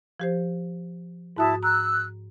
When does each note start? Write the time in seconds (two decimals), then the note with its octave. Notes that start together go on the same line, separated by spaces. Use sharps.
0.20 F3 G4 C5
1.36 G#2 E4 F#4 A5 D#6
1.63 A#5 E6 F#6